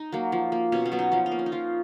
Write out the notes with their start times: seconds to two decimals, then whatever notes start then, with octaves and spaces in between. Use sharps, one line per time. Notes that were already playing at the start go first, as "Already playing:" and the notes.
Already playing: D#4
0.12 F#3 A#3
0.32 F3
0.52 A#3
0.72 B2 C#4
0.86 C#4
0.92 F#3 B3
0.99 D#4
1.12 F3 C#4
1.26 D#4
1.32 A#3
1.39 C#4
1.46 D#4
1.52 F3 F4